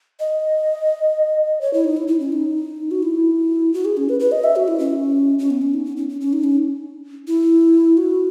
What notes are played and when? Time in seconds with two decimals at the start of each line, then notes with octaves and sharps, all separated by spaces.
0.20 D#5
1.61 C#5
1.73 E4
1.84 D#4
1.97 E4
2.08 E4
2.20 C#4
2.32 D#4
2.91 F#4
3.03 E4
3.74 F#4
3.85 G#4
3.97 C#4
4.09 B4
4.20 B4
4.32 D#5
4.44 E5
4.56 F#4
4.68 E4
4.79 C#4
5.39 C#4
5.50 B3
5.61 C#4
5.74 D#4
5.85 C#4
5.97 C#4
6.09 C#4
6.21 C#4
6.33 D#4
6.44 C#4
7.27 E4
7.97 F#4